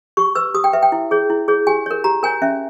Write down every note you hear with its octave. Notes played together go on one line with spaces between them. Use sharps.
G4 C#6
B4 E6
G4 D#6
G5
B4 E5
G5
E4
G#4 C#5
E4
G#4 C#5
G4 G#5
A#4 C#5
G4 A#5
A#4 C#5 G#5
C#4 E5